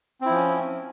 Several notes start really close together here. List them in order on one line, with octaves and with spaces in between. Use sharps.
C4 E4 F3 C#4